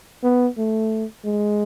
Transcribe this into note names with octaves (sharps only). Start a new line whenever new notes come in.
B3
A3
G#3